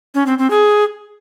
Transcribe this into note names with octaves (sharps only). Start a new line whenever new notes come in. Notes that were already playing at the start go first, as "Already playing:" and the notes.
C#4
C4
C4
G#4